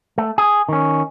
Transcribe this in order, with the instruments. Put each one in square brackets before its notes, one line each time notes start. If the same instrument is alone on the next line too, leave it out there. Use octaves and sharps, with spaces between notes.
[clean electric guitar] A3
G#4
D#3 C#4